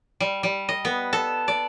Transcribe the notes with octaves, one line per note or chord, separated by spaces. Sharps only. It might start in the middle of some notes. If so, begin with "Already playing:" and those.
G3
G3
D#5
B3
A4
D5